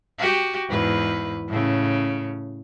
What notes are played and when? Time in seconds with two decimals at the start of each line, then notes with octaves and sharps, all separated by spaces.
0.18 F#4 G4
0.69 E2 G#2 B4
1.48 A2 C#3